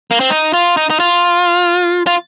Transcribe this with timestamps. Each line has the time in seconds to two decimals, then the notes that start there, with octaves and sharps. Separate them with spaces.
0.11 A#3
0.20 C4
0.30 D#4
0.53 F4
0.77 D#4
0.90 D#4
1.00 F4
2.07 F4